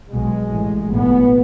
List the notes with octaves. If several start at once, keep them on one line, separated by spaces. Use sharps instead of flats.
B1 B2 G#3
A1 A2
B1 A2 B3